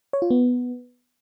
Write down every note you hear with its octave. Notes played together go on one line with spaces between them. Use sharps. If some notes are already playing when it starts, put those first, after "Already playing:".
C#5
F4
B3